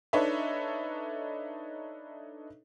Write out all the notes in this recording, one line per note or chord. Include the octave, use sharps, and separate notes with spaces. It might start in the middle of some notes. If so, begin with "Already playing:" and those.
D4 D#4 A4 B4 C#5 E5